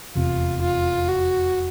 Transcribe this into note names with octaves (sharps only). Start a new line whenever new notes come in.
F1 E2 C3 F4
F4
F#4